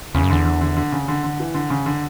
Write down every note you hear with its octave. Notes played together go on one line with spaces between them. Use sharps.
E2 C#3
F#2
E2 D3
D3
D3
D3
C#3
D3
D3
E3
D3
C#3
D3